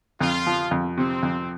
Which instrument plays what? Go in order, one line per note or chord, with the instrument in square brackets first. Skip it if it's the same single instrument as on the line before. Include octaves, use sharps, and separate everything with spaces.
[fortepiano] F2 [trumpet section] F4
[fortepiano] F3
F2
[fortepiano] C3 [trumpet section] C4
[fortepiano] F2